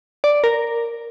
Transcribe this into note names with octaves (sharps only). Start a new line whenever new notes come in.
D5
A#4